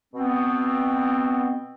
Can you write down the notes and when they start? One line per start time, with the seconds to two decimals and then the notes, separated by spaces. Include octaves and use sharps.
0.14 B2 B3 C4